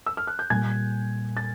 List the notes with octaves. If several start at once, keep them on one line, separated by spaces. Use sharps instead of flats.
E6
F6
F#6
G6
A#2 G3 A#3 G#5 G#6
A6